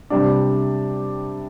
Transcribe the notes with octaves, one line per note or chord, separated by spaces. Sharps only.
C3 G3 D4